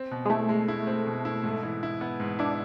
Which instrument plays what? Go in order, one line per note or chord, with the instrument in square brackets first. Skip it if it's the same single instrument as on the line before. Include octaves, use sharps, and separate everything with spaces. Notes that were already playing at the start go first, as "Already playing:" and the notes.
Already playing: [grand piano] C4
B2
[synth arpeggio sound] G#3
[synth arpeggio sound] A3 [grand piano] E4
[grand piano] G#3
E4
C4
B2
E4
G#2
E3
E4
B3
G#2
[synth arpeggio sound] D4 [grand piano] E4